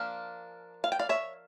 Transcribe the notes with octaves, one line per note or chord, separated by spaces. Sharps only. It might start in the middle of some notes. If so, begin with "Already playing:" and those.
Already playing: F3 A#3 D4 F5
F5
G5
D5 F5
C#5 E5